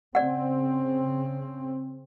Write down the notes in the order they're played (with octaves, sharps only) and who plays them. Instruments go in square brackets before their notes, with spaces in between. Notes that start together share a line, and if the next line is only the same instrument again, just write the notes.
[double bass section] C#3 C4 [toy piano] D5 F#5